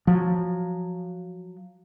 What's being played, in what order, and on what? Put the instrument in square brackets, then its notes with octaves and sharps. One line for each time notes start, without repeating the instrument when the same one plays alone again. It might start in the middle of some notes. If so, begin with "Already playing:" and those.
[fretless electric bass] F3 F#3